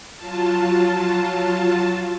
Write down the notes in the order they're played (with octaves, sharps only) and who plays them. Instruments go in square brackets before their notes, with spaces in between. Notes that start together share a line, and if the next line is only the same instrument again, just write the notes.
[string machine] F#3 F4 A5